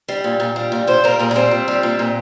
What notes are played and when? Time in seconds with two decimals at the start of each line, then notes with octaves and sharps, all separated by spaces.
0.08 G3
0.24 A#2
0.40 A#2
0.56 G3
0.72 A#2
0.87 A#2 C5
1.04 G3 A#4
1.19 A#2 G#4
1.31 A#3
1.36 G3 C4
1.51 A#2
1.68 G3
1.83 A#2
1.99 A#2